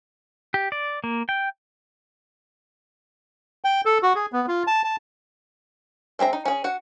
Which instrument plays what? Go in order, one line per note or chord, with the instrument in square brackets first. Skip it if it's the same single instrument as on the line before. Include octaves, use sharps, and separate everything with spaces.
[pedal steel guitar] G4
D5
A#3
G5
[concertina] G5
A4
F#4
G#4
B3
F4
A5
A5
[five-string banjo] G#3 C4 E5 A#5
D#4
C#4 G#4
F#4 F#5